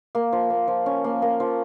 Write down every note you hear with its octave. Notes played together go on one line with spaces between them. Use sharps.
A#3
F3
A#3
F3
C#4
A#3
A#3
F3